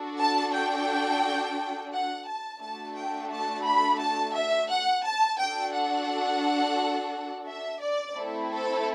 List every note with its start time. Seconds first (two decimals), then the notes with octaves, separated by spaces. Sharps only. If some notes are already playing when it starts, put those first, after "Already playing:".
Already playing: D4 F#4 A4
0.19 A5
0.53 G5
1.92 F#5
2.27 A5
2.61 A3 D4 F#4 A4 A5
2.96 G5
3.30 A5
3.65 B5
4.00 A5
4.35 E5
4.69 F#5
5.04 A5
5.39 D4 F#4 A4 G5
5.73 F#5
7.47 E5
7.81 D5
8.16 A3 C4 E4 A4
8.50 A4